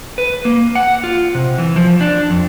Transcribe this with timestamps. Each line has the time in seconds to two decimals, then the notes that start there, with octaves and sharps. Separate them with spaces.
0.18 B4
0.45 A#3
0.75 F#5
1.04 F4
1.35 C3
1.58 E3
1.76 F3
2.01 D4
2.30 F2